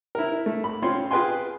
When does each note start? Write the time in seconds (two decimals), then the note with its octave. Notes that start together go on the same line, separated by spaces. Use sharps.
0.15 E4 A#4
0.46 A3
0.64 B5
0.82 C4 C#4 F4 C#5 C6
1.11 F4 G#4 B4 G5 G#5 C6